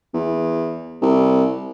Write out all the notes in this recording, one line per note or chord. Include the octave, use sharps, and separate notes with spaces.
E2
C2